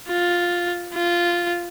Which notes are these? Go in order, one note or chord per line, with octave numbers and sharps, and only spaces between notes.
F4
F4